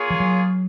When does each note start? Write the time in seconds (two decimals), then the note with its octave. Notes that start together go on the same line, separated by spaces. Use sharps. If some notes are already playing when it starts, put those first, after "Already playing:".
Already playing: A#3 F4 G#4 C#5
0.10 F3
0.20 F#3